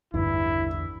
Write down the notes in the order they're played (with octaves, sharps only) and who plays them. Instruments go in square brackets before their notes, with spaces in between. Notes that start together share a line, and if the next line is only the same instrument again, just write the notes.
[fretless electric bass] A1 G2 [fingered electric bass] E2 D3 [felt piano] E3 [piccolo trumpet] E4